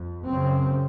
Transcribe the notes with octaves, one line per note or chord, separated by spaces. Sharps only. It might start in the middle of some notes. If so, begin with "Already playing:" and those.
Already playing: F2
F#2 C#3 C4